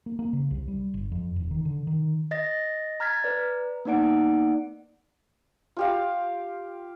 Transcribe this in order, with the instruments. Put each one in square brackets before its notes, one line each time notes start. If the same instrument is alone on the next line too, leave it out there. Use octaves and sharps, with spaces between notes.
[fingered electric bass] A#3
A#3
C#3
C2
G3
G1
F2
E1
D#3
D3
D#3
[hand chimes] D#5 A6 A#6
A#5 F6 G#6 A6 B6
B4 D5 A#5
A#3 B3 D#4 D5 F#5 D7
[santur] F4 G4 F5